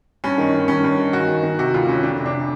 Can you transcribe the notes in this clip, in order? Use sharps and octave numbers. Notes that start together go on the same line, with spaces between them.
G2 C#4
D#3
D#3
G2 C#4
G2
D#3
D#3 F#4
D#3
D#3
C3 F#4
D2 F4
D2 C#4
F2 D4
C3
D4
C3